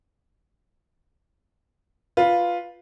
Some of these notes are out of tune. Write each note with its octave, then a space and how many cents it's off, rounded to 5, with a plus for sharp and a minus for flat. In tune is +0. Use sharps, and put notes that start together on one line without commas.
F4 +0 B4 -10